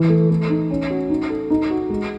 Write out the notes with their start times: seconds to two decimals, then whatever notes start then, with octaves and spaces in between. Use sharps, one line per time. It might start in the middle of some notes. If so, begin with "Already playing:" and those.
Already playing: E3 E4
0.09 A3
0.31 A3
0.50 D#4
0.70 C#4
0.90 F#4
1.10 D#4
1.30 A4
1.50 D#4
1.70 F#4
1.90 G#3